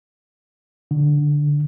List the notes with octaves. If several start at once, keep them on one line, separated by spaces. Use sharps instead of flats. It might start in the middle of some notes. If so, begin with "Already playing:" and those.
D3